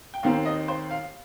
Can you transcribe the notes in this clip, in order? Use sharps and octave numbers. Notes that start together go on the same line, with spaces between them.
G5
D#2 D#3 C4 F5
D#5
C5
F5